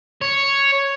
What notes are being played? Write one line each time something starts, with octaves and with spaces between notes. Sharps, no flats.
C#5